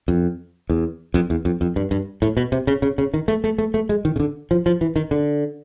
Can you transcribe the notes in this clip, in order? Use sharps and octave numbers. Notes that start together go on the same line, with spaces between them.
F2
E2
F2
E2
F2
F2
G2
G2
A2
B2
C3
C#3
C#3
C#3
D#3
A3
A3
A3
A3
G#3
D#3
C#3
D3
F3
F3
E3
D#3
D3